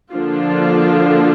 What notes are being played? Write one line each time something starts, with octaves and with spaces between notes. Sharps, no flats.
D3 F3 A#3 D4 F4